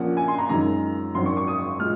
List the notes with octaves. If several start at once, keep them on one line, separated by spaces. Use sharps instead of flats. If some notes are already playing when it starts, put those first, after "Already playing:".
Already playing: A#1 A#2 F3 A#3 C#4 F#5
G#5
C6
A#5
F#2 D#3 G#3 D#4 A#5
G#1 F#2 D#3 F#3 C4 C6
C#6
C#6
D#6
A#2 G#3 F6